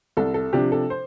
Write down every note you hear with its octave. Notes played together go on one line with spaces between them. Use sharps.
C2 A4
A4
C3 F3 D4 G4
A4
C5